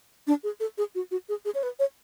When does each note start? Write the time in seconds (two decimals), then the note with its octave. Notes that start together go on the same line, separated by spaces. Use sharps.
0.27 D4
0.44 G#4
0.60 A4
0.78 G#4
0.95 F#4
1.11 F#4
1.29 G#4
1.45 G#4
1.55 C#5
1.63 B4
1.79 C#5